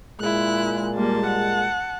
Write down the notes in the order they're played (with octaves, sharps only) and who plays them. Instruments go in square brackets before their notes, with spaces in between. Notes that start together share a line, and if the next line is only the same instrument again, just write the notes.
[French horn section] A#2 G#3 [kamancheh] E4 F#6
[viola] G3 A#3 [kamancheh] A5
[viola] F#5